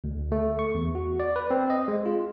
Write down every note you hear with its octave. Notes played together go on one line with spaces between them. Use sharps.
D2
A3
C#6
E2
F#4
D5
B4
C4
D#5
G#3
F4